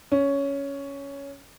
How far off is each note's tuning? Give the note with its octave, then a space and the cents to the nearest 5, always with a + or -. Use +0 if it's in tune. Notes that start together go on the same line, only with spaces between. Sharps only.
C#4 +10